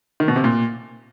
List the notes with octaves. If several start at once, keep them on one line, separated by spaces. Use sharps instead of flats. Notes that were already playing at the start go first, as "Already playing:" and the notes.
D#3
B2
C3
A#2